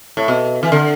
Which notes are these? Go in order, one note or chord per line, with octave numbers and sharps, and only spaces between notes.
A2
B2
E3
D3